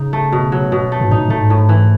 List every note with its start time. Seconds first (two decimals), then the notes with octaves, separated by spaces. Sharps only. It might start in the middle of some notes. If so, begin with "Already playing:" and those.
Already playing: C#3 D#4
0.13 A3
0.32 B2
0.52 F#3
0.72 B2
0.92 A3
1.01 G#2
1.11 A2 D#4
1.28 A2 A3
1.39 G#2
1.50 A2
1.69 E3